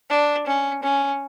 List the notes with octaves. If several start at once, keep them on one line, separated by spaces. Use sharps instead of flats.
D4
C#4
C#4